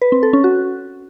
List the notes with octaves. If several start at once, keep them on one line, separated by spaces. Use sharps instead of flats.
B4
C4
A4
C#4
F#4